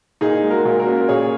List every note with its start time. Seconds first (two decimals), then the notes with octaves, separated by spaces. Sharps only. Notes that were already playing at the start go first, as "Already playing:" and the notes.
0.21 A#2 D#4 G#4
0.43 G#3
0.51 F#4 A#4
0.65 A#2
0.80 F#4 A#4
0.87 C#4
1.09 A#2 G#4 C#5